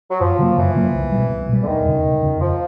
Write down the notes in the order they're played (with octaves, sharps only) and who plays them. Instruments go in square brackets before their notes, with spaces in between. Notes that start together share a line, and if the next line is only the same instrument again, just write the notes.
[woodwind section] F#3
[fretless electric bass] F#2 [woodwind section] F3
[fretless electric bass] C#3 F#3 A#3
[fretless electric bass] F#2 [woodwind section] E3
[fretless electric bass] C#3 F#3 A#3
C2
B2 G3
C2
B2 G3
[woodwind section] D3
[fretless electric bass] E1 [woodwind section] D#3
[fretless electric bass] E2 C#3
E1
E2 C#3
[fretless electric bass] F2 [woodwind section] F3